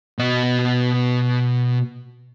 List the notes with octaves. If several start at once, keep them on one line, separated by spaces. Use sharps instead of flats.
B2 D#5